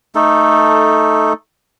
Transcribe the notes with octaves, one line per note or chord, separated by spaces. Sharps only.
A3 D#4 A4